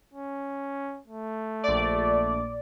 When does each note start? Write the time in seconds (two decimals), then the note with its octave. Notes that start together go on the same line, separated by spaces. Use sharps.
0.14 C#4
1.08 A3
1.63 A#1 D5